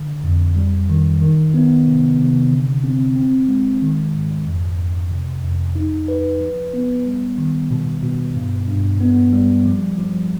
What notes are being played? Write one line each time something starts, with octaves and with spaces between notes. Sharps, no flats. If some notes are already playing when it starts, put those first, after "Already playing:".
Already playing: D3
F2
G3
D#3
D#3
B3
C3
C3
D3
C4
C4
G#3
D#3
G#2
F2
F2
C3
F2
D#4
B4
F3
B3
G3
D#3
B2
B2
G2
G2
B3
G3
F3
F3